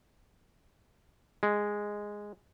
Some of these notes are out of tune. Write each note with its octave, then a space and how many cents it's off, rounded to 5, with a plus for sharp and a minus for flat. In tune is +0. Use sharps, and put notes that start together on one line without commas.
G#3 -5